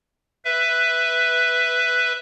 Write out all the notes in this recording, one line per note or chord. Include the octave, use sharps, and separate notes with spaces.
B4 E5